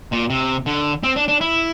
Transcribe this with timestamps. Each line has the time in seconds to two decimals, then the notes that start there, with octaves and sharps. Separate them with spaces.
0.12 A#2
0.30 C3
0.66 D3
1.03 C4
1.16 D4
1.28 D4
1.41 E4